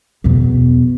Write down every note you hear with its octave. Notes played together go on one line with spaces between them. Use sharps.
E2 B2